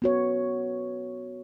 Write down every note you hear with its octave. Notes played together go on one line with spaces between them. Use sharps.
B3 F#4 C#5